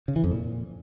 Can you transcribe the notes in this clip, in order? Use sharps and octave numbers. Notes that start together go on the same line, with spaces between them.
C#3
E3
F2
A#2